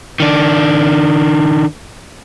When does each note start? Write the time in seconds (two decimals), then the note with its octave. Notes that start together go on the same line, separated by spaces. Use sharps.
0.20 D#3 D4